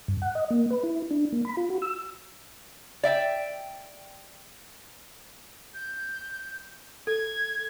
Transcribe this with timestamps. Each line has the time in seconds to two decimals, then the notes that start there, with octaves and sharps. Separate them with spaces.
0.08 G2
0.22 F#5
0.35 D#5
0.50 A#3
0.71 B4
0.83 E4
1.11 D4
1.32 A#3
1.45 B5
1.57 F4
1.70 F#4
1.82 E6
3.03 D5 E5 G5
5.74 G6
7.07 A4 G#6